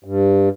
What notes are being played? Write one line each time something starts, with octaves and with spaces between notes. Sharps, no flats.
G2